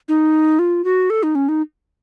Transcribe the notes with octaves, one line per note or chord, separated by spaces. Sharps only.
D#4
F4
F#4
A4
D#4
C#4
D#4